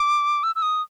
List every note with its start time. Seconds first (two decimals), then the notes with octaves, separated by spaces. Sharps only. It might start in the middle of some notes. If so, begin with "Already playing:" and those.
Already playing: D6
0.43 E6
0.56 E6
0.62 D#6